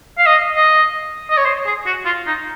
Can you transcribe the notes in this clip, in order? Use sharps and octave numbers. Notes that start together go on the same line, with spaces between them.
F5
D#5
D#5
D#5
C#5
C5
G#4
F#4
F4
D#4